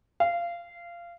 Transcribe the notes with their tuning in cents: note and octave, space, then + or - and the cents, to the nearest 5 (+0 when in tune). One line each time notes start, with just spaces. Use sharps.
F5 -20